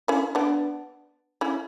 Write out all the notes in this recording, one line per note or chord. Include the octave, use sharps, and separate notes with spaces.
C#4 E4
B3 D4
C#4 E4